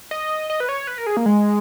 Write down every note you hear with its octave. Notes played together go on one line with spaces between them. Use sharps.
D#5
D#5
B4
C#5
B4
A#4
G#4
A#3
G#3